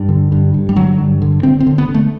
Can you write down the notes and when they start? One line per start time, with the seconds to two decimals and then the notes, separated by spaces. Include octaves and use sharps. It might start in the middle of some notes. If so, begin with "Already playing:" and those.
Already playing: G2
0.09 D3
0.32 G2
0.54 G2
0.69 G3
0.76 D3 F#3
0.98 G2
1.22 D3
1.43 D3 C4
1.60 C4
1.67 D3
1.78 B3
1.89 D3
1.94 A3